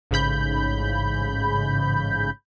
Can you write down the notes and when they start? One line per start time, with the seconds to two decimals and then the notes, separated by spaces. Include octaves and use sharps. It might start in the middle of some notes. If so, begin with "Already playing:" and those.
0.11 A1 G#2 C#3 B5 G6